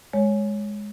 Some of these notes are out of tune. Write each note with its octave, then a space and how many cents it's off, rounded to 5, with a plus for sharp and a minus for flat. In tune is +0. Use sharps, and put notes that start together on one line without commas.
G#3 +0 C#5 +0